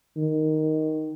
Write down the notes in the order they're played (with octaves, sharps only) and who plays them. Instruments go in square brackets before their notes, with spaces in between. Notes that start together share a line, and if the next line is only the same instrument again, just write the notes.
[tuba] D#3